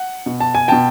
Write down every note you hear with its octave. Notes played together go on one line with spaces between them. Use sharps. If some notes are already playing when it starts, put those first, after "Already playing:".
Already playing: F#5
B2
A5
G#5
B2 G5 A5